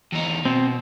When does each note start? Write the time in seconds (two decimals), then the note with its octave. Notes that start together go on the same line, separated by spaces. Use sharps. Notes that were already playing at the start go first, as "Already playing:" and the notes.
0.13 E2 D#4
0.45 B2 C4